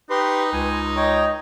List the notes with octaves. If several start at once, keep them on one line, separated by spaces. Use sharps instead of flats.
D#4 G4 B4 C6
C#2 G#5
C#5 D#5 G5 A#5